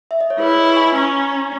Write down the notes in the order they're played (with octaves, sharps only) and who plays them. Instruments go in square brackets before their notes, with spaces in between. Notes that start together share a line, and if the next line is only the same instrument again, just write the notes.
[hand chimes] E5
D#5
C#5
[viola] E4 [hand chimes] G#4 B4
[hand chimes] B4 D#5
C#6
G#5 B5
[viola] C#4 [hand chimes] A#5 C#6